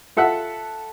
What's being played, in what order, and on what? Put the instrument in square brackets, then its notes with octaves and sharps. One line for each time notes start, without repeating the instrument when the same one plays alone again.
[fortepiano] F4 A4 E5 F#5